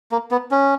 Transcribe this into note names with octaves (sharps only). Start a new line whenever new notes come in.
A#3
B3
C#4